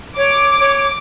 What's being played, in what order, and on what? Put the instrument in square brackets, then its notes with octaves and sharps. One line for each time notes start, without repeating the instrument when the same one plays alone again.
[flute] C#5 [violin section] D6
[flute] C#5